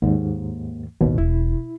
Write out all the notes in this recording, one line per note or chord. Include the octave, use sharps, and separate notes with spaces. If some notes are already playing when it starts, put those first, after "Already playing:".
D#2 G#2 D#3 A#3
A1 D#2 B2
E1 E4